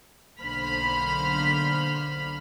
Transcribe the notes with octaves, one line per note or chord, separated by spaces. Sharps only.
B1 D3 A#3 C5 B5 F6